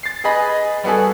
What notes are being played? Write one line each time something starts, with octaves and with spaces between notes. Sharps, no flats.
A6 C7
G#4 B4 D#5 B5
G3 B3 F#4 G#4 A4